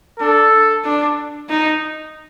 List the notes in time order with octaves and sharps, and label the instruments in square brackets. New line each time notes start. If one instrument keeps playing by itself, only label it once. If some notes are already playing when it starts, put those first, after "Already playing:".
[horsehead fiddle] D4 [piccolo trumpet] A4
[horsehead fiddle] D4
D#4